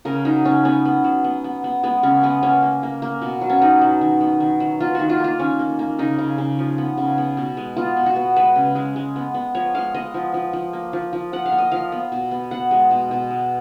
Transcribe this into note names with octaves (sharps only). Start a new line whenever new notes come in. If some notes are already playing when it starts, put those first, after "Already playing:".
C#3 A#4
F#3 D#4
C#3 C#4
B3 C#4
B3
F#3
B3
B3
B3
G#3 B3
C#3 C#4
G#3 B3
A#3 C#4
A#3
A#3
A#3
B2
F#3
C#4
B3 D#4
F#3
D#3
B3
D#3
F#3
A#3 F4
D#3 F#4
F4
A#3 F4
D#3 C#4
A#3
A#3
C#3 D#4
C#3
C#3
F3
B3
C#3
B3
B2
G#3
B3 F4
B2
F#4
B3
G#3 B4
C#3
G#3
G#3
B3
B3
F3 C#5
G#3 F5
B3 D#5
F3
F3
F3
A#3
F3
F3
F3 F#5
F5
A#3
D#5
F3 F5
B3
B2
B3
B3 F#5
G#3
B2
B2
G#3